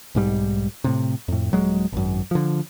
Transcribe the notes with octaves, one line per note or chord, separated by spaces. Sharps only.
B1 G#2 G3
A2 C3
F2 A2
D#1 F#3 G#3
G#1 F#2
D3 F3